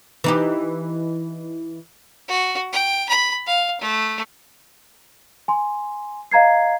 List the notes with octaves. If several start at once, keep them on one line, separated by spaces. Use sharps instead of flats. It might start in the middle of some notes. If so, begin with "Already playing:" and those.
E3 D#4 G4
F#4
G5
B5
F5
A3
G#5 C6
D#5 F5 A#5 G#6 C7